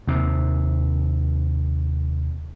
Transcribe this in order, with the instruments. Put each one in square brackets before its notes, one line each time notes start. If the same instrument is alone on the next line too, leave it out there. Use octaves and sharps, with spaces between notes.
[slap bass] D#2 C3